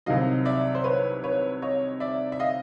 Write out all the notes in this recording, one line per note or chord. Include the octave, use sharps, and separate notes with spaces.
C2 C3 D#3 F#3 D#5 F5
D5 E5
C5
B4 C#5
B4 C#5
C#5 D#5
D5 E5
E5
D#5 F5